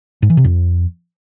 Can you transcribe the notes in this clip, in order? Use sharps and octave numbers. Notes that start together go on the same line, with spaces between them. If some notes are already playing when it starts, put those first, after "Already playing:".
G#2
E3
C3
F2